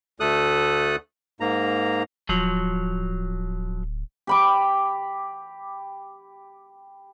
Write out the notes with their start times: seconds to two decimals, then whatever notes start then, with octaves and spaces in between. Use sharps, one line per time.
0.20 D2 A3 A4 D#6 F#6
1.40 G#2 A#3 A#5
2.29 D1 F3 F#3
4.27 G4 B5 D6